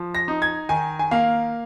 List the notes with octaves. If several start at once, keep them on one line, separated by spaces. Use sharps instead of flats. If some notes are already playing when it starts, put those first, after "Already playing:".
Already playing: F3
A#6
D#4
G#6
D#3 G#5
G#5
A#3 F5